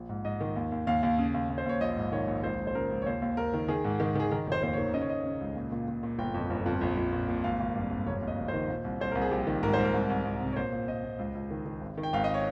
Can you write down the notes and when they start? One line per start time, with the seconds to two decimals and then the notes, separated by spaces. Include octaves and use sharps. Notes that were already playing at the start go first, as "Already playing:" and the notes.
Already playing: A#1
0.09 G#2
0.25 G#2 D#5
0.41 D#3
0.56 D#2
0.72 D#2
0.87 D#2 F5
1.03 D#2
1.19 C#3
1.34 D#2
1.50 D#2
1.58 C5
1.66 D#2 C#5
1.81 A#1 D#5
1.96 G#2
2.12 D#3 C#5
2.28 A#1
2.43 C#2 C5
2.59 C#2
2.67 C5
2.75 C#3 A#4
2.90 C#2
3.02 C#5
3.06 D#2 C5
3.22 D#2
3.37 D#2 A#4
3.53 D#3
3.68 D#3 G#4
3.84 G#2
4.00 D#3
4.15 D#3 G#4
4.31 D#3 A#4
4.47 F1 C5
4.62 D#2 C5
4.73 C#5
4.78 D#3
4.94 C#3 D#5
5.01 C#5
5.09 C#3 D#5
5.25 C#3
5.41 C#2
5.56 A#2
5.72 A#2
5.88 A#2
6.03 A#2
6.18 G1 G5
6.34 F2
6.50 G1
6.66 F2
6.81 A#1
6.97 A#1
7.13 A#2
7.29 A#2
7.44 G#1 F5
7.60 G#1
7.75 G2
7.91 G#1
8.06 F1 C#5
8.22 D#2 F5
8.27 D#5
8.38 F1
8.48 C5
8.53 D#3
8.69 A#2
8.84 C2
9.00 C2 C5
9.11 C2 A#4
9.21 G#4
9.31 A#1 G4
9.47 D#3
9.63 G#2 A#4
9.74 C5
9.79 G#2
9.85 A#4
9.94 C2
10.10 C2
10.25 C2
10.41 C3
10.53 C#5
10.56 A#2 C5
10.72 A#2
10.88 A#2 D#5
11.03 A#2
11.19 C#2
11.35 C#2
11.51 D#3
11.66 D#3
11.82 G#1
11.98 D#3
12.03 G5
12.13 G#1 F5
12.24 D#5
12.34 C#5